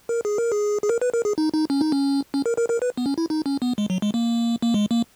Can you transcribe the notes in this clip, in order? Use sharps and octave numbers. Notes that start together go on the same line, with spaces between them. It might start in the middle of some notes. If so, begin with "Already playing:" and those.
A#4
G#4
A#4
G#4
G#4
A#4
B4
A#4
G#4
D#4
D#4
C#4
D#4
C#4
C#4
A#4
A#4
A#4
B4
B3
C#4
E4
D#4
C#4
B3
G#3
F#3
G#3
A#3
A#3
G#3
A#3